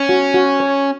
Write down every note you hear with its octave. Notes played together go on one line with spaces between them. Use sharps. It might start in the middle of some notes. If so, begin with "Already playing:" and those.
Already playing: C#4
F#4
F#4
C#5